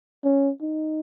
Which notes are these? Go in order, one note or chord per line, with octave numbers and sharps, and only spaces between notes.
C#4
D#4